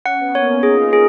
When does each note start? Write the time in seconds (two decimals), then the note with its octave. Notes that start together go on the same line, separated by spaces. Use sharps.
0.05 C#4 F#5
0.21 B3
0.35 A#3 C#5
0.49 C#4
0.63 D#4 G#4
0.72 F4
0.80 D#4
0.93 G#4